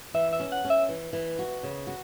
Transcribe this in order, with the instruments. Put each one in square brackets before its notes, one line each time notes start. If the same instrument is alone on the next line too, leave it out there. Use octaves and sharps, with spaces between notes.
[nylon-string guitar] E3 [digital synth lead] E5
[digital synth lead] E5
[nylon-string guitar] C#4
[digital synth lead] F#5
[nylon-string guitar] C#4
[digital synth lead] E5
[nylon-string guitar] E3
E3
F#4
C#3
F#4